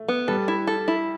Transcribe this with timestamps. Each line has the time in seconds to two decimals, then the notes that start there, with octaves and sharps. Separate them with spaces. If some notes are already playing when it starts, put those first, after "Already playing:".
Already playing: A3
0.08 B3
0.28 G3 A4
0.48 E4
0.67 A4
0.88 E4